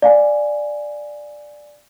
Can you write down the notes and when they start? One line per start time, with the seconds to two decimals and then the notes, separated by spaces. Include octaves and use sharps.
0.02 D5 F5 G#5